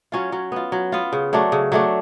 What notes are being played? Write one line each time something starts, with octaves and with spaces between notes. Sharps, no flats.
F#3 C#4 F4
F#3
B3 F4
F#3
B3 F4
C#3
F#3 A3 D4
C#3
F#3 A3 D4